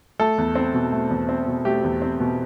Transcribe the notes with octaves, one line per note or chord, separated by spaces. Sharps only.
A3 A4
E2
C4
B2
A3
E2
C4
B2
A3 G4
E2
C4
B2